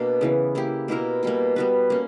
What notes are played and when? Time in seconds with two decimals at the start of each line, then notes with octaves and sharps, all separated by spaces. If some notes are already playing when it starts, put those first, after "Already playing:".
Already playing: B2 A#3 D4 F#4
0.21 C#3 E3 B3
0.55 A#3 E4 G4
0.88 B2 A#3 E4 A#4
1.23 B2 G3 A#3
1.56 G3 B3 F#4 B4
1.90 A#3 C#4